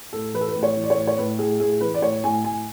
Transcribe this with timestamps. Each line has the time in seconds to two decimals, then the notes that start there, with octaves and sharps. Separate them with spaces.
0.13 A2 A4
0.34 E3 B4
0.41 A4
0.48 B4
0.56 A2
0.63 C#5
0.77 E3
0.84 D5
0.90 C#5
0.97 A2
1.07 C#5
1.18 A2 B4
1.39 A2 G#4
1.60 A2 G#4
1.81 E3 B4
1.94 D5
2.02 A2 C#5
2.24 A2 G#5
2.44 A2 G#5